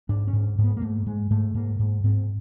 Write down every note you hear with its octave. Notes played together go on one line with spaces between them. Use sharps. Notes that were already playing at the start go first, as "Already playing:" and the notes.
G#2 D4
C#4
G#2
G#2
B3
A#3
G#2 A3
G#2 G#3
G#2 A3
G#2 A#3
G#2
G#2 C4